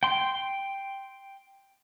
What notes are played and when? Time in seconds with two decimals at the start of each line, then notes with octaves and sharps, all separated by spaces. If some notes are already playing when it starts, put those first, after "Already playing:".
0.03 G5 C6